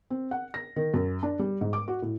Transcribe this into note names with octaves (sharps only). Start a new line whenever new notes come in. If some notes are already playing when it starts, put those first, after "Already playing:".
C4
F#5
A#6
D#3
F#2
D4
G3
G#2
D6
F#4
A2